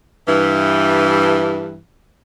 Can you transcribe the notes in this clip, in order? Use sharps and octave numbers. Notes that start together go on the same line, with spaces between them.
G2 E3